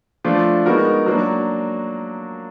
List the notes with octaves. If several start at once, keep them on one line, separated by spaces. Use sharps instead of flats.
F3 A3 D4 F4
G#3 B3 D#4 F#4 A#4
F#3 A#3 D4 F#4